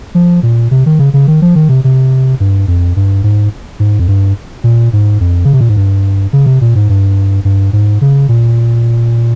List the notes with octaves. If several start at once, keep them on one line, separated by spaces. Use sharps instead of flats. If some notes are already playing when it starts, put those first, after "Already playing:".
F3
A#2
C3
D#3
C#3
C#3
D#3
F3
D#3
C3
C3
G2
F2
G2
G#2
G#2
F2
G2
A#2
G#2
F2
C#3
C3
A#2
G#2
G2
C#3
C3
A#2
G#2
G2
G2
G#2
C#3
A#2